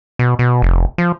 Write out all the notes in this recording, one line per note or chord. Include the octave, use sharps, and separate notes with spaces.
B2
B2
F1
F3